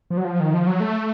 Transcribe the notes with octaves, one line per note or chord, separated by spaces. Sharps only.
F3
F#3
F3
D#3
F3
F#3
A3